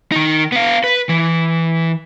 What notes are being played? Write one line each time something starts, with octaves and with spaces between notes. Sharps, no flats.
D#3 D#4
B3 F5
B4
E3